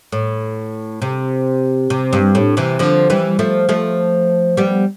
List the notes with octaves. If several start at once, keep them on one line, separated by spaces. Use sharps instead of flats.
A2
C3
C3
G2
A2
C3 E3
D3 F3
E3 G3
F3 A3
F3 A3
G3 B3